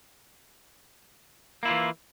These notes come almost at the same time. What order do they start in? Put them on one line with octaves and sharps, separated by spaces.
A#3 E4 F4 E3